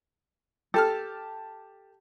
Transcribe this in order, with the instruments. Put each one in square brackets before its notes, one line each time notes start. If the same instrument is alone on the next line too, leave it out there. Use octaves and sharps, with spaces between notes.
[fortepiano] G4 A5 F6 [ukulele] A4